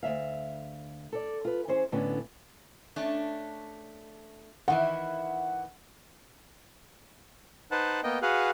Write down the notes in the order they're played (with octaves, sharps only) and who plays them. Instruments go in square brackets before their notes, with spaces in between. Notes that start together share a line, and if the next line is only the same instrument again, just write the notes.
[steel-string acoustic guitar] D2 F#3 E5 F5
A4 D5
F4 B4
E3 C#4 G#4 C5
A2 D3 B3 C#4 D4
[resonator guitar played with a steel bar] A3 C#4 D4
[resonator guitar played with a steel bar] D#3 E3 E4 [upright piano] F#5
[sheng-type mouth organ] D#4 B4 C5 F#5 A5
A#3 B3 D#5 G5
F#4 G#4 B4 F5 F#5